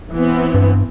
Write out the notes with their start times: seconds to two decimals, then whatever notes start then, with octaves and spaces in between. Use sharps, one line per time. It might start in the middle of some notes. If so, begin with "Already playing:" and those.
0.13 E3 B3 C4
0.54 G2